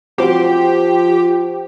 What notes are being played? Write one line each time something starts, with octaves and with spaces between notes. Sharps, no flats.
F3 C4 F#4 G4 C5